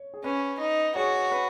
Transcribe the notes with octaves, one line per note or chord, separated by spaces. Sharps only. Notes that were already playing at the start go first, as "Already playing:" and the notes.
Already playing: C#5
G#4
C#4 B4
D#4
F#4 G#4 C#5
B4